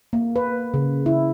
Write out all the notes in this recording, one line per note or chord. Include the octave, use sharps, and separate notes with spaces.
A#3
B4
C#3
E4